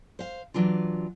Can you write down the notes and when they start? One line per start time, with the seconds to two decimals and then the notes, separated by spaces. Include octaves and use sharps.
0.19 C5 F5
0.54 E3 F#3 D4 F4